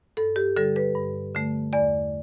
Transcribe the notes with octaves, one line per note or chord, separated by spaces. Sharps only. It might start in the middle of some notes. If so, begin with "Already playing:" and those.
G2 A4
G4
D3 G3 A4
B4
G2
D3 A3
E2 D5